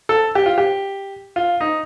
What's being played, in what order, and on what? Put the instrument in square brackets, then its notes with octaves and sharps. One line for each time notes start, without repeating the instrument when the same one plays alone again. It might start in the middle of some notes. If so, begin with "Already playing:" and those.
[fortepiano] A4
G4
F4
G4
F4
D#4